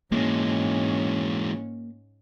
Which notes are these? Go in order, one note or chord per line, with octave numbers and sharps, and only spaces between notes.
G#2 E3 G#3 A#3 C#4